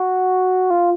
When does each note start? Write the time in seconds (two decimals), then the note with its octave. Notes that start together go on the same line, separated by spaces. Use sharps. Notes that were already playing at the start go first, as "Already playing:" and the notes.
Already playing: F#4
0.70 F4